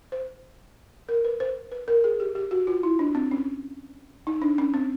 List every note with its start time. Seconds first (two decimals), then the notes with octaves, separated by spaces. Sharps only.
0.12 C5
1.09 A#4
1.25 B4
1.40 C5
1.72 B4
1.88 A#4
2.04 G#4
2.20 G4
2.35 G4
2.51 F#4
2.67 F4
2.83 E4
2.99 D4
3.15 C4
3.31 C#4
4.27 D#4
4.42 D4
4.58 C#4
4.74 C4